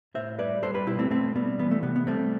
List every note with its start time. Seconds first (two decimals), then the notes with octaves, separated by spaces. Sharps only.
0.14 A2 C5 E5
0.38 G3 B4 D5
0.63 G3 A4 C5
0.74 G4 B4
0.87 B2 E4 G4
0.99 A3 C4
1.10 B2 A3 C4
1.36 G3 B3
1.59 E3 B3
1.71 A3
1.83 C3 B3
1.96 B3
2.07 G3 A3 C4